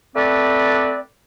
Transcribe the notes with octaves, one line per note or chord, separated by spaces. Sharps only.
A3 C4 B4 D5